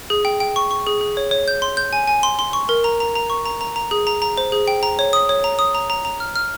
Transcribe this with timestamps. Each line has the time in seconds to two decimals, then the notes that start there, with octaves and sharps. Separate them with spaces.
0.10 G#4
0.25 G5
0.40 G5
0.56 C#6
0.71 C#6
0.87 G#4
1.01 G#4
1.17 C#5
1.31 C#5
1.48 G6
1.62 C6
1.77 G6
1.93 G#5
2.07 G#5
2.23 C6
2.39 C6
2.53 C#6
2.69 A#4
2.84 A#5
3.00 A#5
3.15 A#5
3.30 C#6
3.46 A#5
3.61 A#5
3.76 A#5
3.91 G#4
4.07 A#5
4.22 A#5
4.38 C5
4.52 G#4
4.68 G5
4.83 A#5
4.99 C#5
5.13 D#6
5.29 C#5
5.44 A#5
5.59 D#6
5.75 A#5
5.90 A#5
6.05 A#5
6.20 F6
6.36 F6